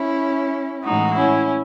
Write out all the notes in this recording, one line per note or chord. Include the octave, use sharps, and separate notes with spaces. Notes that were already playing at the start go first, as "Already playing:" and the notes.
Already playing: C#4 E4
A2 E3 G#3 D#4 F#4
C#4 E4